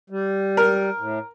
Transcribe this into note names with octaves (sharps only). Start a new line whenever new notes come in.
G3
A#4
A2